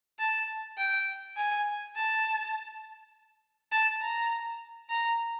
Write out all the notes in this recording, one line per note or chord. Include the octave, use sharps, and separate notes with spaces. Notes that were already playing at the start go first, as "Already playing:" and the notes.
A5
G5
G#5
A5
A5
A#5
A#5